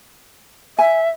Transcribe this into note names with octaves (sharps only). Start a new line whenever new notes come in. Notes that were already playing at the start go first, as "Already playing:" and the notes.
E5 G#5